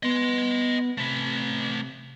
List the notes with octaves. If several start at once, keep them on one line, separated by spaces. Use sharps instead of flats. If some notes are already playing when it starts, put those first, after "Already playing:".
B3 D#5 C6
C3 A3 B4